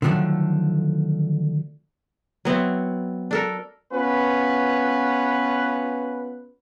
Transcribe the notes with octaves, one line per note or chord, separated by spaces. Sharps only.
D3 D#3 F3 F#3 A3 D4
F#3 B3 C4 E4
D4 A4 A#4
B3 C#4 F4 B4